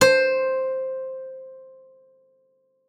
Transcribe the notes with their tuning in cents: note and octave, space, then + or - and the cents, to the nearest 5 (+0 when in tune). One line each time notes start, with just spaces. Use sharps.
C5 +5